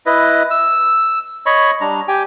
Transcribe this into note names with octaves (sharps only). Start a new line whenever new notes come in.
E4 B4 D#5
E6
C#5 D#5 B5 C#6
G3 D4 A#5
G4 G5 G#5